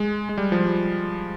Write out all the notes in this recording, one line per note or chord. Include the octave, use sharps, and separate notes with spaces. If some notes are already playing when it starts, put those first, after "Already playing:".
Already playing: G#3
G#3
G3
F3
G3